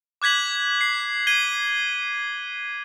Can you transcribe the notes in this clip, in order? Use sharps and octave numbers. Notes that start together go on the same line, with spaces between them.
D6 F#6 G#6 B6 F#7
C7
G#6 C7 D#7 G7